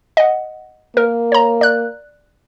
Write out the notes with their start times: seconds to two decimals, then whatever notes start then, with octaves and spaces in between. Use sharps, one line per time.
0.17 D#5 F#5
0.97 A#3 A#4
1.32 C#5 A#5
1.61 D5 F#6